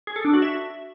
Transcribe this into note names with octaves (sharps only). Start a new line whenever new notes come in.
G#4
A4
D4
F#4
E5